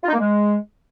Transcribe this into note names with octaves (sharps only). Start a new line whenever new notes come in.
F4
D#4
A#3
G#3